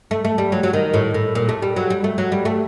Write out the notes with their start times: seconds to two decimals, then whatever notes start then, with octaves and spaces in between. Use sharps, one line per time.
0.11 A3
0.25 A3
0.38 G3
0.52 F#3
0.63 F#3
0.73 D#3
0.94 A2
1.14 A2
1.35 A#2
1.49 A3
1.62 G3
1.76 F#3
1.90 G3
2.04 A3
2.18 F#3
2.32 G3
2.45 A3